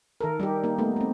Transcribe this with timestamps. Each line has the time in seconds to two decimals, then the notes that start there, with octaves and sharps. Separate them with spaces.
0.21 D#3 A4 A#4
0.40 G3 D#4 G4
0.64 A#3 D#4
0.78 A3 B3 D#4
0.96 A3 C4